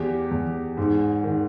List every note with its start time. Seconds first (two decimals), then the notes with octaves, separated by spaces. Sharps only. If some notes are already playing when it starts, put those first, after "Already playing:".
Already playing: E2 G4
0.31 E2
0.77 G#2
1.24 D#3